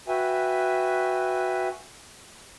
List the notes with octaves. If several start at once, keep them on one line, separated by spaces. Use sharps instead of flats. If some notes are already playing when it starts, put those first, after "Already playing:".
F#4 B4 E5 G5 G#5